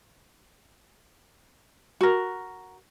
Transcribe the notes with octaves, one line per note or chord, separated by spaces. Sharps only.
F#4 A#4